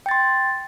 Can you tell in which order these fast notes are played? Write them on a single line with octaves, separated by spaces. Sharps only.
G5 A6 C6